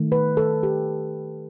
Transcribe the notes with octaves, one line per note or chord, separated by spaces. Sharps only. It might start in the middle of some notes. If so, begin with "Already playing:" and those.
Already playing: D#3 A3
B4
A4
G4